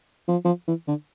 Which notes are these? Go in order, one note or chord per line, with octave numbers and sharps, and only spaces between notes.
F3
F3
E3
D3